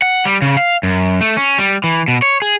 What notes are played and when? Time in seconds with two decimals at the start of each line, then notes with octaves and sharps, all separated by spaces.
0.02 F#5
0.25 G3
0.42 C#3
0.57 F5
0.83 F#2
1.21 A3
1.37 C#4
1.58 G3
1.84 E3
2.08 B2
2.22 C#5
2.42 G#4